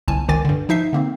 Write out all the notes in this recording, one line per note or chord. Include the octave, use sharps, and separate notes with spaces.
G1 C2 G#5 A5
G1 C#2 D#3 G#5 D6 A6
G2 D3
F3 D#4 E5 C7
D3 A#3 C4